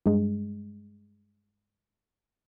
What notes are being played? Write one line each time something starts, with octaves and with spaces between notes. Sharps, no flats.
G2 G#3